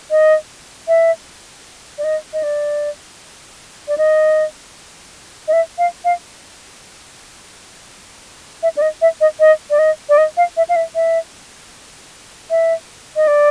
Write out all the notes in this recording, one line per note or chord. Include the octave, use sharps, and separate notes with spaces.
D#5
E5
D5
D#5
D#5
D5
D5
D#5
D#5
E5
F5
F5
E5
D5
D#5
E5
D#5
D#5
D5
D#5
D5
D#5
F5
E5
F5
E5
E5
E5
D#5
D5